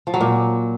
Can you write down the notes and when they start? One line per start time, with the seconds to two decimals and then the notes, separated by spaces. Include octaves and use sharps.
0.07 F3
0.14 F#3
0.20 A#2